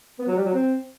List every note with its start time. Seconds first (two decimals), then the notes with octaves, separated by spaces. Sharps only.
0.19 B3
0.27 F#3
0.36 G3
0.45 F#3
0.53 C4